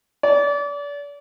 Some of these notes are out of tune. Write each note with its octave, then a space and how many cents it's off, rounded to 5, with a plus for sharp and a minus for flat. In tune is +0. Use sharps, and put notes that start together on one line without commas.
D5 -35